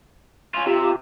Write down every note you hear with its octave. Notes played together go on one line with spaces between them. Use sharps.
C#4 F4
C3 F4 G4